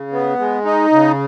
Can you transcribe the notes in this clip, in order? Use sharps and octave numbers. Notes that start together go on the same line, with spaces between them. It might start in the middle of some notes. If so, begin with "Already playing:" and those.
Already playing: C#3
B3
G#3
D#4
C#3